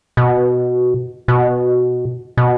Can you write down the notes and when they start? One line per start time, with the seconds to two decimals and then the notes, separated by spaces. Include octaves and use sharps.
0.17 B2
1.28 B2
2.37 B2